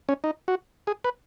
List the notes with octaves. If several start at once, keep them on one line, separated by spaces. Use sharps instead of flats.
C#4
D#4
F#4
G#4
B4